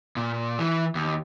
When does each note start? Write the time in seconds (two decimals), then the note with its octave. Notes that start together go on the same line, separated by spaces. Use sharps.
0.16 A#2
0.59 E3
0.95 D#2